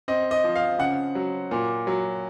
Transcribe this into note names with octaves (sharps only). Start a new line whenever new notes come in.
C4 D#5
D#5
F3
F5
C#3 F#5
F#3
A#2
F#3